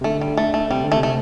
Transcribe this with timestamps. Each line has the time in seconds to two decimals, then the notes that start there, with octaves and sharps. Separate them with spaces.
0.01 C3
0.04 D3 A3
0.21 G3
0.37 A3
0.54 A3
0.70 C3 G3
0.84 D3
0.92 A3
0.97 C3
1.03 A3